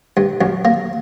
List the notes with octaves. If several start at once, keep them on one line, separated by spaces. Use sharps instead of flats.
G2
F#2
A#3